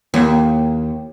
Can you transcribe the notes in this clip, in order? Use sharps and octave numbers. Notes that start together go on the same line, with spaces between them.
D#2